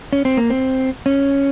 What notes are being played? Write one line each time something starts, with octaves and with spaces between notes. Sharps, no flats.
C#4
C4
A#3
C4
C#4